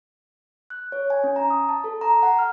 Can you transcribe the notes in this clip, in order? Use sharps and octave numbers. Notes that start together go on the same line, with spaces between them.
F#6
C#5
G#5
C#4
A#5
D#6
A5
A4
A#5
F#5
F6